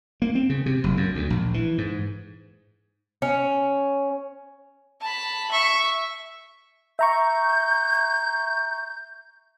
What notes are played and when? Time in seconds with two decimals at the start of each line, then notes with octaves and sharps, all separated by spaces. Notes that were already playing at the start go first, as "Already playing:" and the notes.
0.22 A#3
0.35 C4
0.50 C#3
0.66 C3
0.84 F#1
0.97 F#2
1.15 D2
1.30 A#1
1.54 E3
1.78 G#2
3.22 C#4
5.01 A5 B5
5.51 E5 C#6
6.99 E5 A#5 C#6 G6